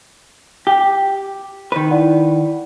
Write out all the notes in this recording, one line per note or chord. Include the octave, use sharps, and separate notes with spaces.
G4
D#3 B4
E4 D5 F#5